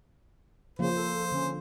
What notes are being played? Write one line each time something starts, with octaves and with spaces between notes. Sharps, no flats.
C#3 F3 A#3 C5
A4
D3 C#4